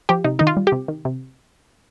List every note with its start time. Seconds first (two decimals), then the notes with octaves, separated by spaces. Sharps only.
0.09 F3 G4
0.24 C3 D#4
0.39 D#3 D#4
0.47 F4
0.57 G3
0.67 G4
0.72 C3
0.88 D#3
1.05 C3